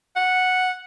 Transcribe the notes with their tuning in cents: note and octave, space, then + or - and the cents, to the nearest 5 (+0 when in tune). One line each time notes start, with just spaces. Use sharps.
F#5 -5